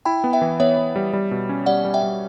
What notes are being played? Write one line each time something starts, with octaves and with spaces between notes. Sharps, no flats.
E4 G5 B5
B3
E5 G5
E3
B3 C#5 E5
E3
G3
G3
B2
C#4
G3 D5 F#5
G3
E5 G5
G3